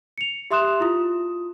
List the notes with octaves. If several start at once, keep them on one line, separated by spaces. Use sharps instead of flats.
C#7 F7
G4 E5 C6 D#6 F#6 E7
E4 F4 D#6